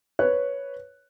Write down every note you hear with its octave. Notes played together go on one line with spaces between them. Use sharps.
B4 C#5 F#6